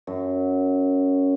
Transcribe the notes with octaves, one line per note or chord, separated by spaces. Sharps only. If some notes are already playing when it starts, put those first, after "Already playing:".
F#2